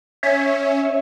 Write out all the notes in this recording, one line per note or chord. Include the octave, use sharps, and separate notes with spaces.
C#4 C#5 E5